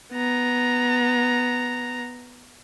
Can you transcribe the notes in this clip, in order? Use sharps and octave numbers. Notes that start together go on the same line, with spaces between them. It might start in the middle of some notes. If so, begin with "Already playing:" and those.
B3 A#5